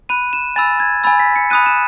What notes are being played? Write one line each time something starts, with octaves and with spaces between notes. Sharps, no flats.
B5 F#6 D#7
E7
G#5 B5 E6 A6
G#6
G#5 B5 E6 A6
B6
C#7
B5 D#6 F#6 D#7
E7